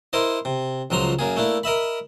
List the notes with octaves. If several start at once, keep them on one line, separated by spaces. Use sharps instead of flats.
E4 A#4 C5 D#5
C3
C#2 F3 F#3 A#5 C6
F#2 A#3 G#4
A3 A#3 D4 E4
A#4 D#5 E5 B5